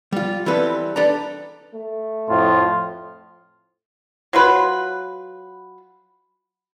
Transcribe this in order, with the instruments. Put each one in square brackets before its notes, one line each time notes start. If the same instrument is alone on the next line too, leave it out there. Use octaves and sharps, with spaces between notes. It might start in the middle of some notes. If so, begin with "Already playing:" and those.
[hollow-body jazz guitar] G3 F4
E3 G3 C4 A4 B4
D4 G4 A4 B4 D5 A#5
[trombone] A3
[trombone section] F2 A2 F3 [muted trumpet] F4
[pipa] F#3 F4 B4